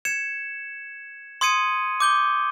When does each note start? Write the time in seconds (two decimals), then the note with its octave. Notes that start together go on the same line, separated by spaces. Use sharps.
0.05 G#6 C#7 E7
1.41 C6 D#6 G#6 C#7 D#7
2.00 D6 G6 G7